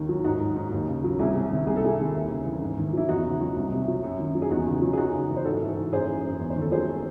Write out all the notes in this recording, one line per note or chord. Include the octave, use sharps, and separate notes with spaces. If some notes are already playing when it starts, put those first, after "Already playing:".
Already playing: D#2 D#3
F#3
G#2 D#4 F#4
F#3
G#2
D#2
C#3
F#3
C2 E4 G#4
C3
D#3
C2 G#4
A4
C3 E4 G#4
D#3
D#2
C#3
E3
G#2
D#3
F#3 E4
E2 D#4 F#4
C#3
F#3
C2
C3
F#3
F#2
D#3
F#3
G#4
E2 D#4 F#4
C#3
F#3
G#4
F#2 D#4 F#4
C#3
E3
C5
G#2 F#4 A4
E3
G#2
F#2 G#4 C5
E3
F#2
E2
C5
D#3
A4
F#3 G#4 C5